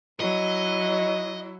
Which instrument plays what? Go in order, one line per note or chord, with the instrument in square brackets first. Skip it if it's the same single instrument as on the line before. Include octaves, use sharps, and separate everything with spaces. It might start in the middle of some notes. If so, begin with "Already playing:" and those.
[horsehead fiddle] F#3 E4 [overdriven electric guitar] D#5